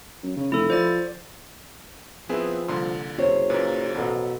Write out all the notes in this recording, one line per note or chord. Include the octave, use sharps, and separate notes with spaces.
F#2
C#3
F1 E4 A4
F3 C5 D5 A6
F3 B3 C4 E4 G#4 B4 E5
C2 A#2 D3 C6
F#1 C3 C5 C#5
F#2 A#2 A#3 B4
A1 B2 F#3 A4